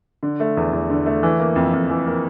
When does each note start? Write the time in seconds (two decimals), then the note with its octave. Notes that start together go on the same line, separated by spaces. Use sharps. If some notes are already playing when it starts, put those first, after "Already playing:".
0.23 D3
0.40 A3
0.57 E2
0.73 E2
0.90 D3
1.06 A3
1.23 E3
1.39 A#3
1.56 F2
1.73 F2
1.90 E3
2.06 A#3